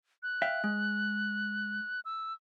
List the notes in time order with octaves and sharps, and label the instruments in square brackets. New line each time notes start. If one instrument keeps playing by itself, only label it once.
[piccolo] F#6
[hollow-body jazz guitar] E5 F5 G5
G#3
[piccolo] E6